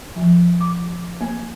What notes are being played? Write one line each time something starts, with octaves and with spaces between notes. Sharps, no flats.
F3
D6
A#3